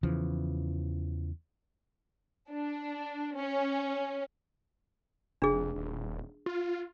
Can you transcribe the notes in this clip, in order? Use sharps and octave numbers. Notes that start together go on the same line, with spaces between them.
E2 C#3 E3 F3
D4
C#4
F1 D4 G#4
D#1
F4